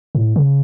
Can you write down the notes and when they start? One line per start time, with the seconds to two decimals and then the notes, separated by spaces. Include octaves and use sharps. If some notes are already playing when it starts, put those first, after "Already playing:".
0.15 A2
0.36 C#3